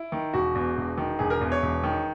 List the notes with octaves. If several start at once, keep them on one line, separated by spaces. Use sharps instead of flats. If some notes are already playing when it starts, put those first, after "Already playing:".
Already playing: E4
D#3
E1 F#4
E2
E1
D#3
E1 G#4
A#4
E2
C#5
E1
D#3